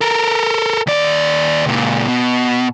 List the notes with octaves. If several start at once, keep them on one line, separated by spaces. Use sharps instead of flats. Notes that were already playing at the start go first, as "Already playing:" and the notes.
A4 A#4
D#2 D5
C#2 A#2
B2